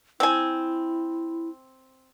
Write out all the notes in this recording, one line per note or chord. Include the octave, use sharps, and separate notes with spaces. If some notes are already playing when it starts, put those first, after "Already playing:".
C4 E4 G#5